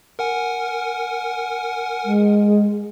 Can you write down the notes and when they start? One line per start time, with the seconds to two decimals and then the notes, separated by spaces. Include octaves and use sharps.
0.19 A#4 F#5 G#5
2.05 G#3